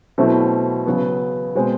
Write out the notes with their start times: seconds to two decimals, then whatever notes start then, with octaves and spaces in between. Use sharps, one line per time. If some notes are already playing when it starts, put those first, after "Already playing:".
0.18 B2 F#3 A3 C4 E4
0.87 C#3 F#3 B3
1.55 B2 G#3 C4